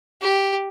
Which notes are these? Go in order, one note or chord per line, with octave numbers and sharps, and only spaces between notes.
G4